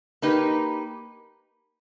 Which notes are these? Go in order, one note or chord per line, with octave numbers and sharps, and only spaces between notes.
A#3 D#4 G4 B4